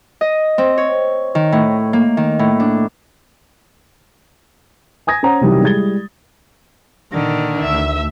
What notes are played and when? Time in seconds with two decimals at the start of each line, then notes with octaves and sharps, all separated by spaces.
0.21 D#5
0.58 C4
0.78 C#5
1.35 D#3
1.52 A2
1.93 A#3
2.17 D#3
2.39 A2
2.60 D4
5.07 G#5 D#6 G#6 A#6
5.23 C#4 C5 F#5 A#5
5.41 C3 D#3 E3 F#3 G3
5.62 G3 G#3 E4 G#6 A6 G7
7.13 A#2 D3 D#3
7.62 D2 E5